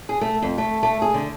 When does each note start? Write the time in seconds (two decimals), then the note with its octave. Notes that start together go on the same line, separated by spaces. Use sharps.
0.09 G#4
0.21 A3
0.42 F2
0.58 A3
0.83 A3
1.02 G#4
1.14 D3